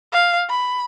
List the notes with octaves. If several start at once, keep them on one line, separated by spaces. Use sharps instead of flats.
F5
B5